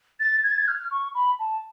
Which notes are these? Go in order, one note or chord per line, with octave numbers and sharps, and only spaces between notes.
A6
G#6
A6
G#6
F6
C#6
B5
A5